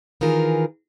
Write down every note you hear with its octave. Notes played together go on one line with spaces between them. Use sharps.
D#3 E3 F4 G#4 A#4